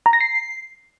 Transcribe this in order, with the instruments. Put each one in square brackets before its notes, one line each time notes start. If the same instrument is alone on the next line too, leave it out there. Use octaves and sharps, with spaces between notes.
[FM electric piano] A#5
A#6
C7